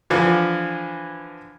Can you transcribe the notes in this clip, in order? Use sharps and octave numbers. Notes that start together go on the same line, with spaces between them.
D3 E3 F3